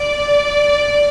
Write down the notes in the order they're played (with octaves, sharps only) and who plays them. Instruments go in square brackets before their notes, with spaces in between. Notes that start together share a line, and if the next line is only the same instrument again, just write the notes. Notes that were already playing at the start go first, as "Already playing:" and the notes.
Already playing: [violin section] D5